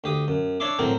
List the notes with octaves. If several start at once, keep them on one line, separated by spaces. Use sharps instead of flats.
D2 G4 D#6
F#2
D4 C#5 D5 E5 C6 D6
A2 F#3 C4 A#4 C5